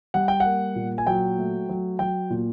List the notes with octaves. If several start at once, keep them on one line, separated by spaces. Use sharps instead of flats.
G3 F#5
G5
F#5
A#3
A#2
G#5
F#3 G5
A3
F#3
F#3 G5
A#2